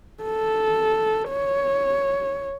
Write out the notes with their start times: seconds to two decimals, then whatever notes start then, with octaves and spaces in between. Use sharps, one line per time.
0.23 A4
1.30 C#5